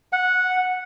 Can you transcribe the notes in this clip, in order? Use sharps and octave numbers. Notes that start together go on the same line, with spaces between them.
F#5